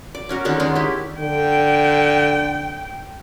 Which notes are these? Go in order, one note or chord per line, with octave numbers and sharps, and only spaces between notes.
D5
C#4 F#4 A#4
D3 D#3 G#3 C#4
D#3 G#3 C#4 D4
E4 G4
D3 G5